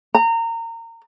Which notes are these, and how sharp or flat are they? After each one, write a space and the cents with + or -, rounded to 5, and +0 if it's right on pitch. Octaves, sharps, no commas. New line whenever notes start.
A#5 -25